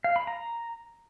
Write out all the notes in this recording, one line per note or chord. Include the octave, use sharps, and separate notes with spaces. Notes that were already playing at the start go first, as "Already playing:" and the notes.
F5
B5
A#5